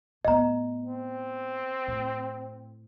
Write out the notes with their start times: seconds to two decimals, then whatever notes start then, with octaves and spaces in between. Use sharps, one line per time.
0.25 A2 B3 D#5 A#5
0.86 C4
1.87 A2